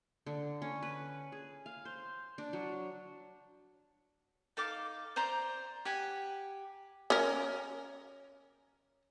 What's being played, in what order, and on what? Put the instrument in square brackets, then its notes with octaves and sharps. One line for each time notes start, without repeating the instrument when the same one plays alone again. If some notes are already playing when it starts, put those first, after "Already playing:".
[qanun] D3
C#4
B4
G#4
F5
C5
D4
F#3
[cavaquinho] D#4 A4 F5 D6
C5 D5 A#5 C6
G4 F#5 G#5
[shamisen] C#4 A#4